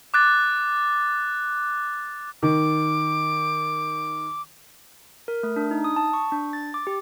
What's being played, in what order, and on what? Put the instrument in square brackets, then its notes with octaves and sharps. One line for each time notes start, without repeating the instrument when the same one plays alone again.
[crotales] D6 F#6 A6
[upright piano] D#3 [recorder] D6
[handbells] A#4
A3
D4
D#4
D#6
A5
C#6
D4
A6
D6
G4